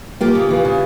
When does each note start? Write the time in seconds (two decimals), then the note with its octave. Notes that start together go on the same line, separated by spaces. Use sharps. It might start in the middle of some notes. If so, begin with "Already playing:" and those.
0.21 A#3 F4 G4
0.35 C#3
0.50 E3
0.65 C#3